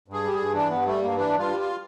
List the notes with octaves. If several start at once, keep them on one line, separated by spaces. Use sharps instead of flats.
G2 G#4
G3 G4
G#4
G2
E3 D4
G2 B3
G3 A3
G2 A#3
E3 D4
G2
F4
G3
F4